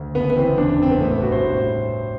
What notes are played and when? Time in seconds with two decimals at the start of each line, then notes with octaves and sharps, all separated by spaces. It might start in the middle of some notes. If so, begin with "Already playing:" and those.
Already playing: D2
0.15 F#1 B3
0.30 B3
0.37 E3 C4
0.58 E2 D4
0.79 C3 C4
0.91 B3
1.00 A1 A3
1.11 B3
1.22 G2 F#4
1.32 C5
1.43 A2